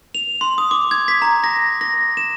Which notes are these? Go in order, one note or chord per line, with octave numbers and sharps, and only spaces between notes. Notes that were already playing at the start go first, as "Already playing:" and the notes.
F7
C6
D#6
D6
G#6
B6
A#5
A#6
A#6
E7